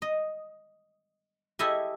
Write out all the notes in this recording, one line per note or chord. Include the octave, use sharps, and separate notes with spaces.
D#5
E4 G4 A4 D#5 E5 G#5